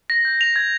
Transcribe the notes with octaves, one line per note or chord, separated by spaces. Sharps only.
A#6
G6
F7
G#6